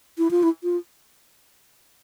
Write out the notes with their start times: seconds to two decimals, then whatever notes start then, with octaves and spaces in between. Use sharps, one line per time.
0.18 E4
0.31 F4
0.43 E4
0.63 F4